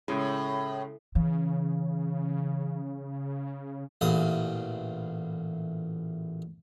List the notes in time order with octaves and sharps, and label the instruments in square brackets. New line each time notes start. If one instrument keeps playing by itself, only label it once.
[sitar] A2 [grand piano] C#3 G#3
[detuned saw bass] C#3 [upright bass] E3
[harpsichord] A1 E2 A#2 D#6